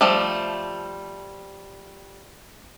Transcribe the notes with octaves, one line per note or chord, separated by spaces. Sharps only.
F3 G3 A3